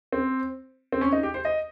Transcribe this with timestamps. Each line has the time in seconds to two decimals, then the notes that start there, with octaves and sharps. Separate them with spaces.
0.12 C4
0.92 C4
1.01 C#4
1.13 D#4
1.23 G4
1.34 C5
1.45 D#5